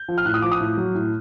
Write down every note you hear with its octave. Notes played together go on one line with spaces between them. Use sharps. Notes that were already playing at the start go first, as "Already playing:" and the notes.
Already playing: G6
F3
F6
A2 F#6
D#6
F3 D6
D#6
A2
F#3
A2